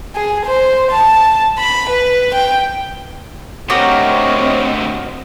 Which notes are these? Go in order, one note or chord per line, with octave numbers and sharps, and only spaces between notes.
G#4
C5
A5
B5
B4
G5
D2 D#3 C4 F#4 G4 A#4 C#5 D#5